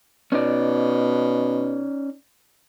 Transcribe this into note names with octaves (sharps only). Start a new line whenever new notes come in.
B2 C#4 D#4 D5